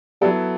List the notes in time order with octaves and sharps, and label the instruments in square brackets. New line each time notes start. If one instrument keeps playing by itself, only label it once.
[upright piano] F#3 B3 E4 A4 [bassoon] G3